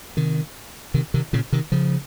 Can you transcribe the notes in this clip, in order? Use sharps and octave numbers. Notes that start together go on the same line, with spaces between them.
C3 D#3
C3 D#3
C3 D#3
A#2 C#3
C3 D#3
C#3 F3